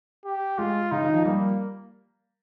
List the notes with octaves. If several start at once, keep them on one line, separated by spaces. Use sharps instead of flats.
G4
G#3 F4
C#3 D#4
D#3
F3
G3 A#3